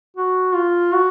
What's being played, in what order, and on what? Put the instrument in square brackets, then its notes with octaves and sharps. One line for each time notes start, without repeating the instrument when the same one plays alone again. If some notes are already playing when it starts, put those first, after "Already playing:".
[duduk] F#4
F4
F#4